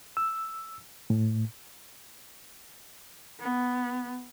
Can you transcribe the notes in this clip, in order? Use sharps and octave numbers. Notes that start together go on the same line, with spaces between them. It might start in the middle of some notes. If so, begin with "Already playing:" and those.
E6
A2
B3